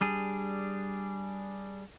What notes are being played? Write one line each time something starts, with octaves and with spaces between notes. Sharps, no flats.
G3 D4 G#4